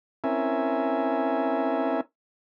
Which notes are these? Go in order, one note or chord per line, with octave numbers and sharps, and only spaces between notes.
C4 C#4 E4 A#4 E5 G#5